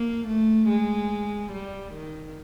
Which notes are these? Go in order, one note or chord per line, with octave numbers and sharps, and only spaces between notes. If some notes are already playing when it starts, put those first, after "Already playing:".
Already playing: A#3
A3
G#3
G3
D#3